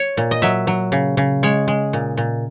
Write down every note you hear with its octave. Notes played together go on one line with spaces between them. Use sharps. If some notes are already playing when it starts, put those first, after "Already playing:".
Already playing: C#5
A#2
D#5
F#3 E5
F#3
C#3
C#3
G#3 C#5
G#3
A#2
A#2